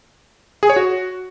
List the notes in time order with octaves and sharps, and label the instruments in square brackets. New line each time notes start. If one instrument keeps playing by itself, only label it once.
[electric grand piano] G#4
C#5
F#4